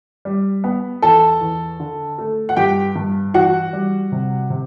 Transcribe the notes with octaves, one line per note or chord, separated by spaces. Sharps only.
G3
B3
E2 A4 A5
E2
D3
A3
F#5
G2 G4 G5
G2
E3 F#4 F#5
G3
C3
C3